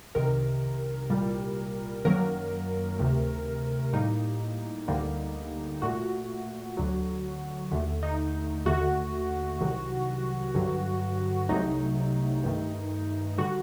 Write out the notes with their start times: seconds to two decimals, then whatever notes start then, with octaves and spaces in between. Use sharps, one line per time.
0.15 C2 C3 D#3 A#4
1.10 C2 A#2 G3
2.05 F#2 D#3 F#3 A#3 A#4
2.99 D2 C3 D#3 A3
3.93 A2 G3 A#3 D#4
4.88 D2 D3 G3 A#3
5.82 A#2 A3 F#4
6.77 D2 D3 F#3
7.71 D#2 D3 A3
8.03 D#4
8.66 D#2 D3 A3 F#4
9.61 C2 C3 D#3 F#3
10.55 G2 D3 F#3
11.49 C2 C3 F#3 A3 D#4
12.44 G2 D#3 A3
13.38 D3 G3 F#4